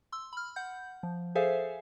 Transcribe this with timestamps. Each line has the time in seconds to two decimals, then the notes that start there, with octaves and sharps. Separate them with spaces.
0.12 C6 E6
0.33 B5 F6
0.56 F#5 G6
1.03 F3
1.35 G#4 A4 C5 E5 F5 G#5